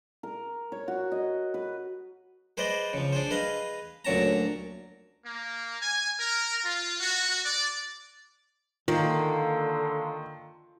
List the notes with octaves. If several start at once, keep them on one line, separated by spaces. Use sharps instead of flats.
A#4
C#5
F#4
D#5
B4
G#4 B4 C5 D5 D#5
C#3 F3
D4 G#4 C5
G#4 B4 D#5 F5
D2 A#2 F#3 C#4 A5 A#5
A#3
G#5
A#4
F4
F#4
D5
D3 D#3 A#3 F4